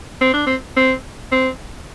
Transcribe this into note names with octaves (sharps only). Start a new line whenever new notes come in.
C4
D4
C4
C4
C4